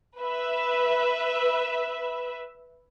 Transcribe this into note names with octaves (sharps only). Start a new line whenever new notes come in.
B4 E5